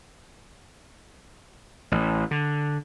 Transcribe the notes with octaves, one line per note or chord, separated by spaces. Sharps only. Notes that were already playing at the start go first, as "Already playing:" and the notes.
A1
D3